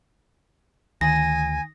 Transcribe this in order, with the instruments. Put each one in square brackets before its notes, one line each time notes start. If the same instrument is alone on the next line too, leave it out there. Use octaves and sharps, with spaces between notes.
[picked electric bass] D2 [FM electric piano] D#3 [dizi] G#5 [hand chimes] A#6